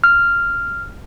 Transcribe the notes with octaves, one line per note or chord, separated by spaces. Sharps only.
F6